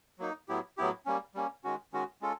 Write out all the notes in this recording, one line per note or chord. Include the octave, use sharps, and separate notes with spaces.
F#3 A#3 D#4
A2 F#3 B3 E4 G4
A2 F#3 B3 E4 G4
G3 A#3 C#4
G3 A#3 C#4
D#3 G#3 C#4 F#4
D#3 G#3 C#4 F#4
G#3 C#4 F4 A4